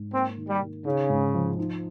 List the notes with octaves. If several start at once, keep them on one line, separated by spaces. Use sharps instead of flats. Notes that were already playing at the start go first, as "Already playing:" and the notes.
Already playing: G#2
A#3 C4
D#3
G3
D#3
C#3 D#4
G#2
F3
D#4